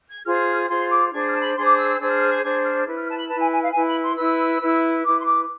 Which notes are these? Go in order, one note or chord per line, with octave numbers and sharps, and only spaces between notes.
G#6
F4 G#4 C5 F6
F4 G#4 C5 C6
D6
D4 G#4 C5 G#6
F6
A5
B5
D4 G#4 C5 C6
D6
E6
E6
D4 G#4 C5 E6
F6
F6
G#6
D4 G#4 C5 G#6
F6
E4 B4
F6
A5
B5
E4 B4 A5
G#5
G#5
F5
E4 B4 G#5
B5
C6
E4 B4 E6
E4 B4
E4 B4 D6
C6
D6